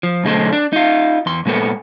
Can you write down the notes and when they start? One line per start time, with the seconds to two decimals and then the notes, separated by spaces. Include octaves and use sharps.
0.03 F3
0.24 B1 D3 G#3 A3 C5
0.53 D4
0.73 D#4 F4
1.26 E2 C6
1.46 A#2 G#3 B3 A4